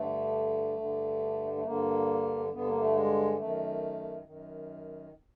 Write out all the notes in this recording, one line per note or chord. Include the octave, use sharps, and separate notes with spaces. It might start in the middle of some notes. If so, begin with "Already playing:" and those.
Already playing: G2 D3 A3
G2 D3
A3
G2 D3 A#3
G2 D3 B3
A#3
A3
G#3
F#2 D#3 A3
F#2 D#3